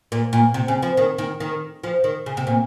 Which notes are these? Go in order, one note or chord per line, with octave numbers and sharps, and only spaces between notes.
A#2
A#2
C3
C#3
F3
D#3
D#3
D#3
F3
D#3
C#3
C3
A#2